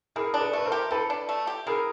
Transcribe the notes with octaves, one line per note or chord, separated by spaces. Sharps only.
E3 G#4 A#4
D4
A4 B4
A3 B4
A#4 C5
G4
E3 A4 B4
D4
A3
G4
E3 G#4 A#4